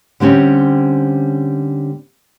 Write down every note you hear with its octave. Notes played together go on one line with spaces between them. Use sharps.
D3 G3 C4 C#4